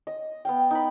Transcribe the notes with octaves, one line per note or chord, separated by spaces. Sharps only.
D#5
B3 F5 G5
D#4 B5